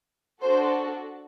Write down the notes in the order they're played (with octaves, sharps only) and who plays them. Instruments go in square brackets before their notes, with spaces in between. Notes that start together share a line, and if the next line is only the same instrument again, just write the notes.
[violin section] D4 F#4 A4 C5